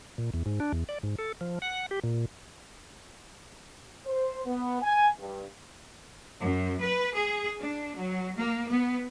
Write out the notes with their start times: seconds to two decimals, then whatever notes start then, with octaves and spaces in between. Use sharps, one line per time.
0.18 A#2
0.34 E2
0.46 G#2
0.60 D4
0.72 E2
0.89 D5
1.03 G#2
1.19 A4
1.41 F3
1.62 F#5
1.91 G4
2.04 A#2
4.07 C5
4.46 B3
4.82 G#5
5.19 G2
6.42 F#2
6.80 B4
7.15 G#4
7.61 D4
7.97 F#3
8.38 A#3
8.71 B3